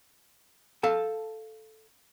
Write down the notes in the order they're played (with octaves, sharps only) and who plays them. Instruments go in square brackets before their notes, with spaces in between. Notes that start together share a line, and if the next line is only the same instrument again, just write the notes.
[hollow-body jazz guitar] A4 F5 A5